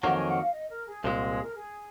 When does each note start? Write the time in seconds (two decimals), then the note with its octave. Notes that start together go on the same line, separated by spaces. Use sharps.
0.03 F2 D#3 F#3 A#3 F#5
0.16 G#5
0.28 F#5
0.41 F5
0.53 D#5
0.70 A#4
0.86 G#4
1.04 C2 A#2 G#3
1.16 F#4
1.29 G#4
1.42 A#4
1.54 G#4